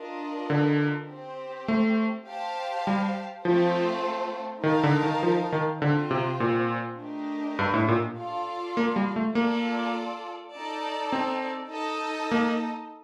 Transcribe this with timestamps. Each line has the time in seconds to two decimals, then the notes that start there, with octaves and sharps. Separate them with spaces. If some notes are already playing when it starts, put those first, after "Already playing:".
Already playing: D4 F4 A#4 D#5
0.50 D3
1.09 C4 G4 C5
1.68 A3
2.28 G4 C5 F5 A5
2.87 G3
3.45 F3 A3 C4 F4 A4 C5
4.63 D#3 D#4 A#4 F5 A5
4.83 D3
5.03 D#3
5.23 F3
5.52 D#3
5.82 D3 C4 F4 C5
6.11 C3
6.40 A#2
7.00 A3 D4 G4 A#4 D#5
7.59 G2
7.74 A2
7.88 A#2
8.18 F4 A4 D5 F5
8.77 A#3
8.96 G3
9.16 A3
9.35 A#3 F4 A4 D5
10.54 D#4 A4 D5 A5
11.12 C4
11.72 D#4 A4 D#5 A5
12.31 A#3